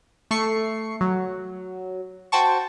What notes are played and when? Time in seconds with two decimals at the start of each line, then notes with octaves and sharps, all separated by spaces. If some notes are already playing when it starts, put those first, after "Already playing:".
0.31 A3 C#6 C7 C#7
1.01 F#3
2.32 F#4 C5 G5 A5 C#6